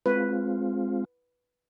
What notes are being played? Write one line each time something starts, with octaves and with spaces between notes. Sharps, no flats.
G#3 C4 F4 B4